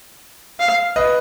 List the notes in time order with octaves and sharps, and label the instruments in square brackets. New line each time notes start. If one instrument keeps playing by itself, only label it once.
[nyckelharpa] F5
[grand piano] B4 D#5